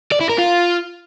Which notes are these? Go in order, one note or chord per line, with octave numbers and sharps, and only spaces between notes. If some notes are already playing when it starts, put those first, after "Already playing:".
D5
E4
A#4
F4